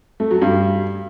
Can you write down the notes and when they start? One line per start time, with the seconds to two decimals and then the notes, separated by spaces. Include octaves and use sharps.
0.20 A3
0.31 F#3
0.42 G2